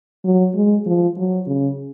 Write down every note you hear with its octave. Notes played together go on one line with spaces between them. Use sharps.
F#3
G#3
F3
F#3
C#3